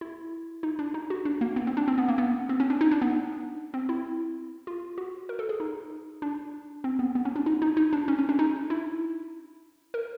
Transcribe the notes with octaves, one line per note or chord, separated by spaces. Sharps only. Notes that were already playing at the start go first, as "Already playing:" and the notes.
E4
D#4
D4
D#4
F#4
D4
A#3
B3
C4
D4
C4
B3
A#3
B3
C4
C#4
D4
D#4
D4
B3
C4
E4
F4
F#4
A#4
A4
G#4
D#4
D4
C4
B3
B3
C#4
D4
D#4
D#4
D#4
D4
C#4
C#4
D4
D#4
E4
A#4